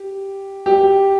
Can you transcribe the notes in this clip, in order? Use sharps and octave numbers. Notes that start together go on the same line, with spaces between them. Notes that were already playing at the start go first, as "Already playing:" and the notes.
Already playing: G4
G4